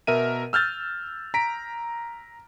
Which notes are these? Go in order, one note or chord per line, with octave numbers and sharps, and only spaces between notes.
B2 A#4 E5 D#7
E6 F6 G6 A6
A#5 B6 D7